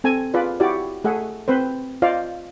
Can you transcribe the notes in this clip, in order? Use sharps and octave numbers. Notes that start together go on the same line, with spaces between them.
C4 A4 G#5
F4 G#4 B4 D5
E4 F#4 G4 D5
A3 G#4 E5 F#5
C4 B4 C5
F4 C5 D5 D#5 F5